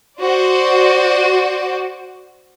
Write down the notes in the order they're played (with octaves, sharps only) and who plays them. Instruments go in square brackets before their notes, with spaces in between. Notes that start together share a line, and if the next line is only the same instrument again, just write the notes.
[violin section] F#4 C5 D5